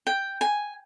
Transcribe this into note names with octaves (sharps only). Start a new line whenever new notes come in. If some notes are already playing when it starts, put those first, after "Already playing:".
G5
G#5